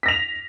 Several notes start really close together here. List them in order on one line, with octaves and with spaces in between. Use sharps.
B6 A#6 F7